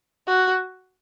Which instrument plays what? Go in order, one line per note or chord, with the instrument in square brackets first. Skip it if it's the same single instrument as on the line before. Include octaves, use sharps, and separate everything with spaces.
[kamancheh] F#4